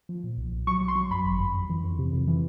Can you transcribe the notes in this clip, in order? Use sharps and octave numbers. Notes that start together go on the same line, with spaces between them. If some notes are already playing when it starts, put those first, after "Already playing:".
F3
A#2
B1
B1
F#3 C#6
F#3
C6
F#3
F#2 B5
G#1
F#2
F2
E3
F2
C3
F2
E3